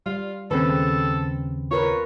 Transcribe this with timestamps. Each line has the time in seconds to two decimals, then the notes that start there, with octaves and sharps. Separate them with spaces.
0.06 G3 F4
0.51 D#2 C#3 C4 A4 B4
1.71 F4 A#4 B4 C#5